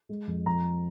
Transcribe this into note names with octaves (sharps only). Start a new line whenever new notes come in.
G#3
F2
F2 A#5